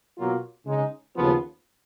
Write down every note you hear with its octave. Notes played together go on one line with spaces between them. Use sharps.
B2 F#3 A#3 F4
C#3 G#3 D#4
D#2 C#3 F3 B3 F4